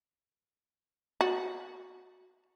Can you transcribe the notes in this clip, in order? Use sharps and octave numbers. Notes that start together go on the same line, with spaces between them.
F#4